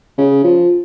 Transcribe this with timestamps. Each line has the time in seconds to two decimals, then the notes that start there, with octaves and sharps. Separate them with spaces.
0.18 C#3
0.44 F3